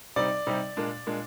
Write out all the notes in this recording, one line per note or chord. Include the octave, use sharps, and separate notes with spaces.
C3 G3 C4 D#4 D5
C3 G3 C4 D#4
A#2 G#3 D4
A#2 G#3 D4